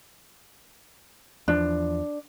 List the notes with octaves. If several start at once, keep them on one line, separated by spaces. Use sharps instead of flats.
E2 F3 D4